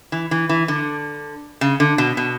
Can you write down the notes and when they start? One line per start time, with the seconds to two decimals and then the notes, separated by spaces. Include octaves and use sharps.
0.12 E3
0.31 E3
0.49 E3
0.68 D3
1.61 C#3
1.80 D3
1.98 B2
2.17 B2